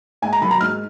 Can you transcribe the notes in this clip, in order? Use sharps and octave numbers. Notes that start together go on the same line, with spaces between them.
G#2 G#5
A#5
D#3 F#3 B5
A#5
G#2 F6